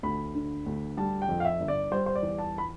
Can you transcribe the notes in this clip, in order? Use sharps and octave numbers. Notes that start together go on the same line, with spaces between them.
D2 B5
D3
D2
G3 A5
G5
F2
F5
E5
G1
D5
G3 C5
C5
D5
E2
A5
B5